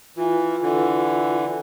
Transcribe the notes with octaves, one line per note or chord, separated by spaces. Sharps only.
E3 F4
D3 E3